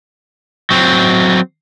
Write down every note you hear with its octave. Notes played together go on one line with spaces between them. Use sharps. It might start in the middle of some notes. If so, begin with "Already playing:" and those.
F#3 C4